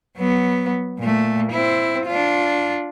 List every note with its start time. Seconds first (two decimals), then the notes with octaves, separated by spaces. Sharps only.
0.17 F#3 B3
0.99 A#2 A3
1.51 C4 E4
2.07 D4 F4